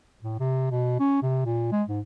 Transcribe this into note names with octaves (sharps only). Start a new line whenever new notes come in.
A2
C3
B2
C#4
C3
A#2
G#3
G#2